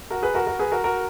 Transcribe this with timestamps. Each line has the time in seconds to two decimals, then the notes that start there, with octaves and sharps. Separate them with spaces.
0.11 F#4 A#4
0.22 G#4 B4
0.35 F#4 A#4
0.47 F#4 A#4
0.59 G#4 B4
0.72 F#4 A#4
0.84 F#4 A#4